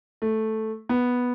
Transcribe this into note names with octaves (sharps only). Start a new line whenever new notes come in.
A3
B3